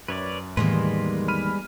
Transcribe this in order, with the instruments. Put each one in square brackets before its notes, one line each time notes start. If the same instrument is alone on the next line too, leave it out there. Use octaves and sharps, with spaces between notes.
[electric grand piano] F#2 [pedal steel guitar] B4 C#5 D5
[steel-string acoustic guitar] E2 D#3 A#3 [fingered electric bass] A2 [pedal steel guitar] G3 G#3 B4 [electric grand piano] C6
[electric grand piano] B5 F6 D#7